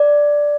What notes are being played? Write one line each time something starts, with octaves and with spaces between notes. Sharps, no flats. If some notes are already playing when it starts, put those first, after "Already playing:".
Already playing: D5